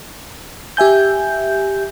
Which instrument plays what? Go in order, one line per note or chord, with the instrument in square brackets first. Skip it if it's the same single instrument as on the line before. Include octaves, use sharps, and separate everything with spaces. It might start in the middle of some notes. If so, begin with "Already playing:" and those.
[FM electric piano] G4 E5 G#5 G6